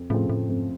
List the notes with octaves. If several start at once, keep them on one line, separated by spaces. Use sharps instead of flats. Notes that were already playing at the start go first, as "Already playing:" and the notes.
Already playing: F2
A2 C#3 F3 A3 C4
A2
F2 G#2